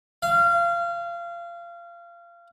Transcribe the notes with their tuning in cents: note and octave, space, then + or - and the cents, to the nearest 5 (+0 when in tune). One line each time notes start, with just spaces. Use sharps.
F5 -25